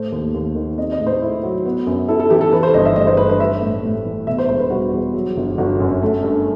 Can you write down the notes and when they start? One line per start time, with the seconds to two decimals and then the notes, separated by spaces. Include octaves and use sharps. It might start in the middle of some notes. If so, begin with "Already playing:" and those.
Already playing: A2 A3 C5
0.12 D#2
0.34 D#2
0.55 D#3
0.78 C4 D#5
0.92 D#5
1.00 A2
1.07 C5
1.22 E4
1.44 F#3
1.65 B3
1.87 F#2
2.08 E4 A4
2.20 A4
2.30 E3 G4
2.41 A4
2.52 E3 B4
2.63 C5
2.74 G1 D#5
2.85 E5
2.96 A3 D#5
3.07 C5
3.17 G2 B4
3.29 B4
3.40 G3 E5
3.62 A2
3.84 A2
4.05 E3
4.27 B2 E5
4.38 C5
4.49 E1 C5
4.59 B4
4.70 G3 F#4
4.93 E2
5.14 F#3
5.37 G1
5.58 G1 F#4
5.80 F#2
6.02 A3
6.23 G2